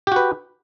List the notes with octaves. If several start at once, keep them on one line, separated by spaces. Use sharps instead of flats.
F#4 G4 B4